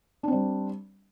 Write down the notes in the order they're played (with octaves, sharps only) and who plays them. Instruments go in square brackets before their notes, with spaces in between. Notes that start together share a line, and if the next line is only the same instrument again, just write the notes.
[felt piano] D4
C4
G3